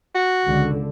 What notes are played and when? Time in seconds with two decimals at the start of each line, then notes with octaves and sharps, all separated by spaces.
0.16 F#4
0.46 C#2 D3